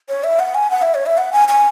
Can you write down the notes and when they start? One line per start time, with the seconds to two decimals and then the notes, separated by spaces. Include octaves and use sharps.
0.09 C#5
0.24 E5
0.39 F#5
0.55 G#5
0.70 F#5
0.82 E5
0.94 C#5
1.06 E5
1.18 F#5
1.33 G#5
1.48 G#5